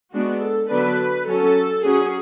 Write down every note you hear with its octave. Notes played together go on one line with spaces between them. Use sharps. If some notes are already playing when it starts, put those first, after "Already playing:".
G#3 B3 D4 F#4
A4
D3 F#3 B3 D4 B4
F#3 C#4 A4
F#3 C#4 G#4